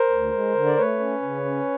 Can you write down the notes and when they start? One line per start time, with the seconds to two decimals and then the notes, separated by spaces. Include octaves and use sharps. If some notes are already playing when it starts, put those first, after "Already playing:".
Already playing: A#4 C5
0.10 D2
0.32 G#3
0.54 D3
0.66 D5
0.77 A3 B4 C#5
0.99 C#4
1.22 C#3
1.45 C#4